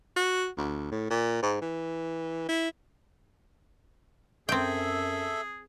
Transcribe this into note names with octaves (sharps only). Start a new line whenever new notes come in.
F#4
D2
A2
A#2
G#2
E3
E4
F#2 C4 G#4 A4 E5 G5